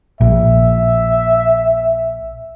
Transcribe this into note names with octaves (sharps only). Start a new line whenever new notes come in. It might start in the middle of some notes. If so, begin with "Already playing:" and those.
A#1 E5